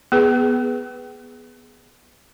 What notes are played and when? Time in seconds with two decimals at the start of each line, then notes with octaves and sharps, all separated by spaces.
0.12 B3 G#4 B4